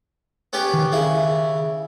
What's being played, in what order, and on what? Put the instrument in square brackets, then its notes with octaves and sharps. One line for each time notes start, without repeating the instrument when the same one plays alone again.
[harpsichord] B3 C#4 G4
[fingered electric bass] D#3
[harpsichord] C#3 E4